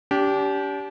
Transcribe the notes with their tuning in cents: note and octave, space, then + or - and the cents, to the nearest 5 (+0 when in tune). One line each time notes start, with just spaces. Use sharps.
D4 -40 G4 -10